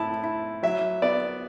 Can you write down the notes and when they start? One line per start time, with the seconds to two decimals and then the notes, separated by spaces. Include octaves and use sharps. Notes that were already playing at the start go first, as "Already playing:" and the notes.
Already playing: A2 E4 A5
0.24 E4
0.63 F#3 E5
1.02 B3 D5